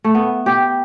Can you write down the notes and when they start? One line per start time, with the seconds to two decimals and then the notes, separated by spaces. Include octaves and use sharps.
0.04 A3
0.15 B3
0.46 G4